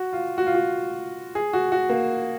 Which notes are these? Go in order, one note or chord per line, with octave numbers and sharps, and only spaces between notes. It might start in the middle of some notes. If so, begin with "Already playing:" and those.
Already playing: F#4
F4
F#4
F4
F#4
G#4
F#4
F#4
A#3